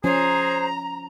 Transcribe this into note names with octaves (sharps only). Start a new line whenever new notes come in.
F3 C#4 G#4 C5 A#5